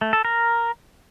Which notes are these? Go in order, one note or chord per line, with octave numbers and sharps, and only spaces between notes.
A3
A4
A#4